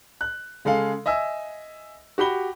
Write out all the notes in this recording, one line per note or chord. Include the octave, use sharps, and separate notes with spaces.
F#6
C#3 G#3 G#4 A4 F5
D#5 E5 G#5 E6
F#4 G4 B5 G7